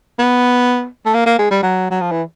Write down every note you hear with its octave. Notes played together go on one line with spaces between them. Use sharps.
B3
A3
A#3
A#3
G#3
G3
F#3
F#3
F3
E3